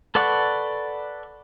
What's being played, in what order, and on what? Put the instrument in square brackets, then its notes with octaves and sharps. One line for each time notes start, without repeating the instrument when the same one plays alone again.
[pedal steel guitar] A4 B4 D5 F#5 C#6